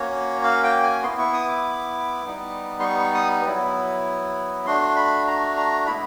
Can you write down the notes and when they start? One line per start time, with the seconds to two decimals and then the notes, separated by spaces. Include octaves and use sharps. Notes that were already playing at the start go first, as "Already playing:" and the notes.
Already playing: A#3 C#4 F#4 C#5
0.43 F5
0.64 G5
0.83 G#5
1.03 B3 E4 C6
1.18 C#6
1.33 D#6
1.48 D6
2.25 G3 B3 D#4
2.80 C6
2.84 C#6
3.00 C#6
3.15 D#6
3.46 F#3 B3 E4
4.66 A3 D4 F#4 C6
4.96 B5
5.27 A#5
5.57 A#5
5.87 G#3 B3 E4 B5